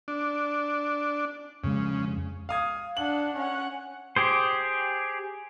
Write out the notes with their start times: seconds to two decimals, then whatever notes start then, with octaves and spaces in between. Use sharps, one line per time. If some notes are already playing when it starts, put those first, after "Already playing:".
0.08 D4
1.64 F2 C#3 G#3
2.49 F5 D#6 G#6
2.97 D4 F#5 F#7
3.36 C#4 F#5
4.16 G4 G#4 C5